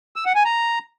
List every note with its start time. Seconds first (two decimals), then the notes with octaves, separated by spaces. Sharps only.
0.16 E6
0.26 F#5
0.35 G#5
0.45 A#5